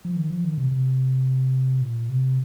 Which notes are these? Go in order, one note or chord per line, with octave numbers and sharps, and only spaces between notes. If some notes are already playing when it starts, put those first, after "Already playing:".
F3
D#3
F3
D#3
C3
C3
A#2
C3